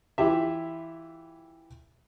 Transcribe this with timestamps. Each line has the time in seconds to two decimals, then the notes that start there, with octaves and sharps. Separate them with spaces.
0.18 E3 E4 F4 G4 E5